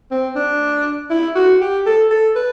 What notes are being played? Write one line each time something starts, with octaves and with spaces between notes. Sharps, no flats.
C4
D4
E4
F#4
G4
A4
A4
B4